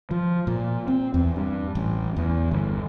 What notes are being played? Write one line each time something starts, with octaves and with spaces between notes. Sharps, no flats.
F3
A#2
C4
E2
G2
A1
E2
G1